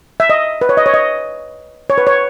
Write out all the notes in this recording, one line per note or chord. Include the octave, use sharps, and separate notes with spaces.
E5
D#5
B4
C#5
D#5
C#5
D#5
C#5
B4
C#5